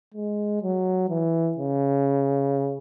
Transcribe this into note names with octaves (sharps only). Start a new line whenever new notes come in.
G#3
F#3
E3
C#3